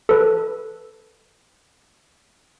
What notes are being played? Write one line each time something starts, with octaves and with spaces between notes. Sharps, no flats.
A4 B4